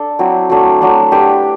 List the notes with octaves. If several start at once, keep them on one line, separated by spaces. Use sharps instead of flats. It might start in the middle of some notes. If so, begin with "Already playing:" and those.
Already playing: D4 A4
F#3 C4 E4
F#3 A3 D4
F#3 A3 D4
D4 G4 B4